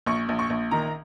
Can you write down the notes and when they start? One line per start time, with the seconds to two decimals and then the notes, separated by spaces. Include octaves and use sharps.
0.06 A#1 C#6
0.29 A#1
0.39 C#6
0.50 A#1
0.71 D#3 A#5